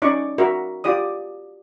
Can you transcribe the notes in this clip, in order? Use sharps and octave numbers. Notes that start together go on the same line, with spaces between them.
C#4 D#4 D5 C#6
F#4 A#4 E5
F4 G4 D5 D#6